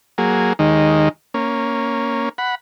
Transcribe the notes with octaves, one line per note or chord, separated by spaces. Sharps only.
F#3 A#3 G#4
D#2 D#3 G#3
A#3 C#4
F#5 B5